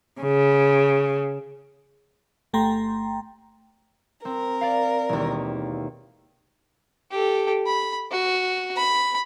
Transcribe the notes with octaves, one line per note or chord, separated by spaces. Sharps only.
C#3
G1 A3 G5 A#5 C6
C4 A#4
D5 F5
E1 D#2
G4 A4
B5
F#4
B5